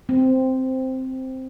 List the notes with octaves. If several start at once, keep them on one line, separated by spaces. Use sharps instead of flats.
C4